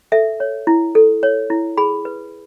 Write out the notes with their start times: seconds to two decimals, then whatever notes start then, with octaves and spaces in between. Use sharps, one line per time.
0.12 A4 E5
0.40 C#5
0.67 E4
0.95 A4
1.23 C#5
1.50 E4
1.77 G#4 B5
2.05 B4